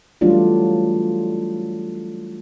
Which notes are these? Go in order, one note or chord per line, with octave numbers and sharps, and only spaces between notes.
E3 F#3 G3 A3 D4 F4